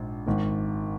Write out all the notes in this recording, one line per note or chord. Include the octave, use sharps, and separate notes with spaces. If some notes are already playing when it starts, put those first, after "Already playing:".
Already playing: A#1 G#2
G#1 G#2 D#3